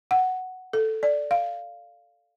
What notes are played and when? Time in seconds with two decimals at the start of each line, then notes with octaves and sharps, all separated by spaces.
0.11 F#5
0.73 A4
1.03 D5
1.31 F5